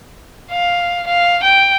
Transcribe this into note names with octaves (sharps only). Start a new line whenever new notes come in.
F5
F5
G5